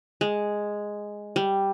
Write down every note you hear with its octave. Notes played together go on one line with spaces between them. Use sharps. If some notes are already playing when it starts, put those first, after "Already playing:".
G#3
G3